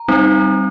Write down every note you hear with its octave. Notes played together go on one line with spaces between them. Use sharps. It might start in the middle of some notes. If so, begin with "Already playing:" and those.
Already playing: A#5
G3 C4 D#4